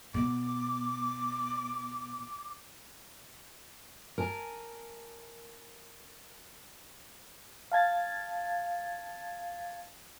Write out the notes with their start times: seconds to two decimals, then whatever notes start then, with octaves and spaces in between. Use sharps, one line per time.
0.14 B2 D6
4.18 A#4 G#5 A5
7.72 F5 A5 G#6 A6